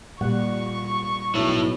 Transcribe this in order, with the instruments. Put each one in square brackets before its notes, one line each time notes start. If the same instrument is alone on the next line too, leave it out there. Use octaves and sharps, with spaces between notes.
[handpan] A#2 G3 F#5 [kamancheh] C#6
[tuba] B1 [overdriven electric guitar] E4 C#5